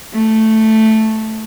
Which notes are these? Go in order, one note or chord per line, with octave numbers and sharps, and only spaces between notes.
A3